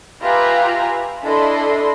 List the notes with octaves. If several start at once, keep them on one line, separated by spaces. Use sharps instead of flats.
F4 G4 B4 E5 G#5 A#5
D4 E4 A4 D#5 B5 C6